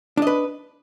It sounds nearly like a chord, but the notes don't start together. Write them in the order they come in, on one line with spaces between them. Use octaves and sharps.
D4 D#5 B4